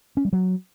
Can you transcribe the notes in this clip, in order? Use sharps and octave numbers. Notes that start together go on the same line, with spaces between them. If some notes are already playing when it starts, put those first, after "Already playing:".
C#4
G3
F#3